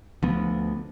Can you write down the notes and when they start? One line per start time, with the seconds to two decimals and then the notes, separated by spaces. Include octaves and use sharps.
0.23 D2 F3 B3